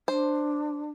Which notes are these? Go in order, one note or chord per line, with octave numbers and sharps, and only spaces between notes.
D4 C5